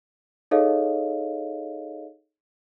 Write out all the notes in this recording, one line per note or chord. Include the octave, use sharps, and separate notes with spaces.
D#4 G#4 A4 C#5 D#5 F5